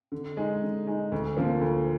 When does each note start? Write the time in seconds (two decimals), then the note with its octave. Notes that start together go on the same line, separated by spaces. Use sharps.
0.12 D3
0.37 G#3 D#4
0.62 D3
0.87 G#3 D#4
1.12 D2
1.37 D3 F3 A#3
1.61 D2